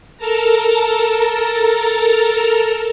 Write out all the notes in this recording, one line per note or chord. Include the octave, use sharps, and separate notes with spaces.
A4 A#4 A5 A#5